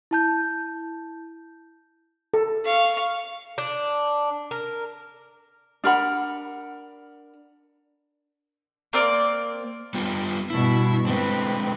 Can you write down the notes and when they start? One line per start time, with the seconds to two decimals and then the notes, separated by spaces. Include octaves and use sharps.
0.11 E4 A5 G6
2.34 A4
2.65 F5 C#6
3.58 D4
4.51 A#4
5.84 D4 A#4 F#5 B5
8.93 A#3 C4 D5
9.94 G3 B3 F4
10.50 G2 B2 E4
11.07 D3 G#3 C4 B4